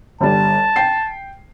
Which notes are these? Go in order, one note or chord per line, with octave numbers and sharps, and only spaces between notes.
G1 G3 A5
G5 C7